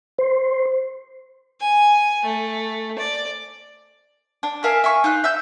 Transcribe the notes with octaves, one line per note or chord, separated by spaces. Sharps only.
C5
G#5
A3
D5
D4
A#4 E5 F5 G#5
E5 G#5 C#6
D#4 F4 F#6
E5 E6 G6